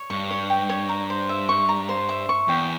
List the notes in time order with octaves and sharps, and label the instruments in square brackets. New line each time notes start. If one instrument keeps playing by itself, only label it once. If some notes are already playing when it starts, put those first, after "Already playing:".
Already playing: [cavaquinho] C#5
[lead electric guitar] G2 [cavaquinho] C#6
[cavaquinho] C#5
G5
C#5
A#5
C5
E5
C#6
A#5
C5
E5
C#6
[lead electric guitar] E2 [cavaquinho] G5